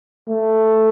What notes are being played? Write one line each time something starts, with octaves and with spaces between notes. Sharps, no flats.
A3